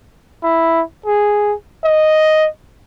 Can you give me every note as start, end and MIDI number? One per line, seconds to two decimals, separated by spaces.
0.43 0.82 64
1.06 1.54 68
1.85 2.48 75